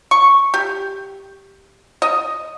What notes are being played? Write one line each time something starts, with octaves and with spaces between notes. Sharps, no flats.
C#6
G4
D#5